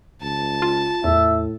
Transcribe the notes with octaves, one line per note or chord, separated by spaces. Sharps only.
C#2 A5
F4
E2 A2 E5